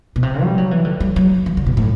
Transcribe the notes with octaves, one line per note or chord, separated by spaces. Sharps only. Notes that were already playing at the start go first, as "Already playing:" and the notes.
B2
C3
G3
F#3
E3
D3
G3
F#3
E3
D3
B2
A2